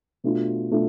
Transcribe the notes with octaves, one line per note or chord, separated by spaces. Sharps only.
B2 A3 D4 F4
B2 A3 D4 F4